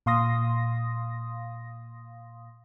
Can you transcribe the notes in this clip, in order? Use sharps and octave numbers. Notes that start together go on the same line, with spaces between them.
A#2 F5 C6 D#6 A#6